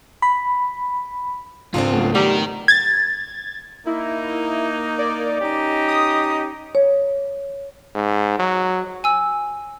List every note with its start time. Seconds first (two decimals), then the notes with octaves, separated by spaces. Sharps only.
0.22 B5
1.74 C#2 G#2 C4 D4 F4
1.92 F#3 A3 B3
2.15 G3 D#4 A#4 F#5
2.68 G#6 A6
3.87 A#3 D#4 E4
4.99 D5
5.41 C#4 D#4 G4
5.88 D#6
6.75 C#5
7.95 G#2
8.39 F#3
9.04 G#5 E6